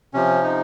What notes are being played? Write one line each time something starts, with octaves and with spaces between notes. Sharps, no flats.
C3 F3 C#4
D#4